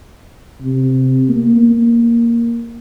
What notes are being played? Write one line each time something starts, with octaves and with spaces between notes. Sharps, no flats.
C3
A#3
A#3